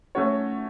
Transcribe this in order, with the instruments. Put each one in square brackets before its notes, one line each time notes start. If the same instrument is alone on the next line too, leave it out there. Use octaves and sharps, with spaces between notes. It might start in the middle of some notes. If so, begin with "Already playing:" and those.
[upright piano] A3 C#4 F#4 C#5